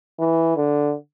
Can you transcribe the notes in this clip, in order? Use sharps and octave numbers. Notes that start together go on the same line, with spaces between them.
E3
D3